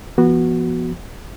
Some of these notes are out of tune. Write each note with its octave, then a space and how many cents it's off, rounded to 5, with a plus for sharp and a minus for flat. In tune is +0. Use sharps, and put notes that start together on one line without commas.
F3 -45 B3 -25 F#4 +0